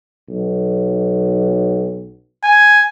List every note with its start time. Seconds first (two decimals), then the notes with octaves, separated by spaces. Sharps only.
0.29 B1
2.44 G#5